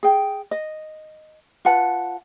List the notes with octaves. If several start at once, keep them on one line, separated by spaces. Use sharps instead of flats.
G#4 G5
D#5
F4 B4 F#5 A5